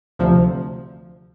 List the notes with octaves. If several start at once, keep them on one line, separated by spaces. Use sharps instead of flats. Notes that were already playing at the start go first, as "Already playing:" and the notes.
D2 C3 F3